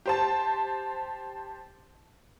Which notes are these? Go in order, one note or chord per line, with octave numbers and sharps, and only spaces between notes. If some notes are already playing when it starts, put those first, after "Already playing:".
G4 C5 A5